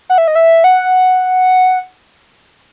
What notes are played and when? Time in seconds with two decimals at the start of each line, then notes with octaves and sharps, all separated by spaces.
0.10 F#5
0.18 E5
0.28 D#5
0.35 E5
0.64 F#5